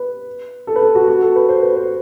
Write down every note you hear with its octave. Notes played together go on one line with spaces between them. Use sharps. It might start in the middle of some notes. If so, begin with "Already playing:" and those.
Already playing: B4
A4
B4
A4
F#4
F#4
A4
B4
C5
B4
C5